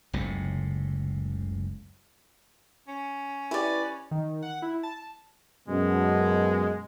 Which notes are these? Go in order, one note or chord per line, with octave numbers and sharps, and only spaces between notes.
F#1 C#2 A2 C3
C#4
E4 G4 B4 D5
D#3
F#5
E4
A5
F#2 B2 G#3